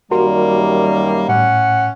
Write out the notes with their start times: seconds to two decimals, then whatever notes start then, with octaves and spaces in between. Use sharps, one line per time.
0.11 F#2 D#3 G3 A#3 F#4 A#4 C6
1.29 A2 C#4 F#5